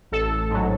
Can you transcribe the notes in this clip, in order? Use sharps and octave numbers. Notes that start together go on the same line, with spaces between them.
A1 A4
G#2 F#3